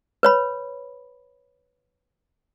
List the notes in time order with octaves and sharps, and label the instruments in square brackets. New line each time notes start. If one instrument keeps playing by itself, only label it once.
[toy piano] B4 C#5 B5